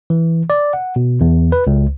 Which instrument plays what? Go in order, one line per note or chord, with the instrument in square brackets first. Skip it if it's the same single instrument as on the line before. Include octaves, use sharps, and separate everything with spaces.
[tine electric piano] E3
D5
F#5
B2
E2
B4
C#2